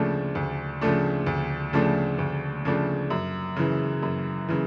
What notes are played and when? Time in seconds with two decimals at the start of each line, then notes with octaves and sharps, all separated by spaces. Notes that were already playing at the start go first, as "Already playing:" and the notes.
Already playing: D2 C#3 F3 A3 D4
0.35 D2
0.81 C#3 F3 A3 D4
1.27 D2
1.73 C#3 F3 A3 D4
2.19 D2
2.65 C#3 F3 A3 D4
3.10 F#2
3.56 C#3 E3
4.03 F#2
4.49 C#3 E3